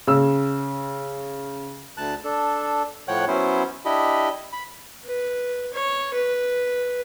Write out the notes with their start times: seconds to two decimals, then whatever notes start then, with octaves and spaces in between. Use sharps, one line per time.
0.07 C#3 E6
1.97 D2 A5 F#6
2.24 D4 A4
3.08 A2 F3 C#5 F#5 G5 F#6
3.28 F#3 B3 C#4 E4 C5
3.85 D4 E4 G4 D#5 B5
4.53 B5
5.04 B4
5.73 C#5
6.13 B4